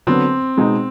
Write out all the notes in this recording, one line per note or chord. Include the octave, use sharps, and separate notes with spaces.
D3 F#3 B3 C4
B2 G#3 B3 D#4